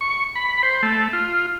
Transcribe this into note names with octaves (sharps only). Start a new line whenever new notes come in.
C#6
B5
C5
A3
F4